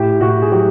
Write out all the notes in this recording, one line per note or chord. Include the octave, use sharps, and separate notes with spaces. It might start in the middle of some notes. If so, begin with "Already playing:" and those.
Already playing: A2 G4
A2 F#4
G#4
F#3 G4